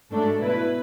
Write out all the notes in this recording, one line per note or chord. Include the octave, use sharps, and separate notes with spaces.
G#2 F#3 A3 D4 A4
B2 A3 E4 B4